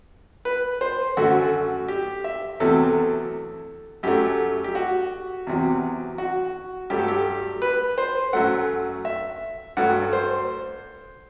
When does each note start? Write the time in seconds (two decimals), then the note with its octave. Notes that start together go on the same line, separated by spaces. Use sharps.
0.45 B4
0.81 C5
1.17 F#2 D3 A3 F#4
1.88 G4
2.24 E5
2.60 E2 C3 F#3 A3 A4
4.03 F#2 F#3 A3 G4
4.64 G4
4.75 F#4
5.47 E2 C3 F#3
6.18 F#4
6.90 G2 F#3 A3 G4
6.99 A4
7.08 G4
7.62 B4
7.98 C5
8.33 F#2 F#3 A3 F#5
9.05 E5
9.77 G2 F#3 A3 F#5
10.13 C5